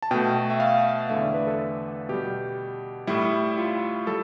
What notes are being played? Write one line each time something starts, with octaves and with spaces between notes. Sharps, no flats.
A5
B2 A3 G5
E5
F5
E2 D3 A3 E5
D5
B4
A4
B2 G3 G4
A2 G3 E4
F4
G3 A4